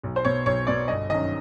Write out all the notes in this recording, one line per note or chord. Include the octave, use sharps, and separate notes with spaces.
B1
C5
B2 C#5
B1 C#5
B2 D5
G1 D#5
F#2 D#3 D#5